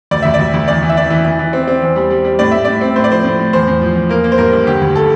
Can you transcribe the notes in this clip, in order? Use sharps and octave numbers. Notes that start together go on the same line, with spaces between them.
D2 D5
D2 E5
D5
D2
D2
E2 D5
E3
E5
E3 D5
E3
E3
E3
C4
C4
E2
G3
G3
G3
A2 D5
A2 E5
A2 D5
C4
A2 C5
D5
F3 C5
A2
A2
E2 C5
E2
F3
E2
A#3 A#4
A#3
C5
G2 A#4
G2
D3 G4
D2
A4